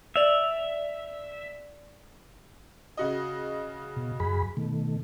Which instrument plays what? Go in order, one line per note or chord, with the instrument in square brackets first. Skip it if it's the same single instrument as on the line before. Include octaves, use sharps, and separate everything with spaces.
[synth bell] D5 F7 [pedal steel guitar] E5
[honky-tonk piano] C#3 F#4 D#5
[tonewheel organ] B2
F#2 G#4 B5
B2 D#3 A3